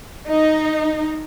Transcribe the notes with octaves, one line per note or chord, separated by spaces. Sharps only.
D#4